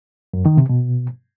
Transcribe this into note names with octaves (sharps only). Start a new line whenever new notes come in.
F#2
D#3
C3
B2